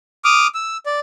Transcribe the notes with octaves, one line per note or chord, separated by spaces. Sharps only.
D6 D#6 F6
E6
D5